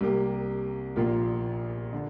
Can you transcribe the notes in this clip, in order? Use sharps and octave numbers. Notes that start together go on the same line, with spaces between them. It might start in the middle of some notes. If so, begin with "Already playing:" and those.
C2 C3 A#3 G4
A#1 A#2 A#3 F4
D3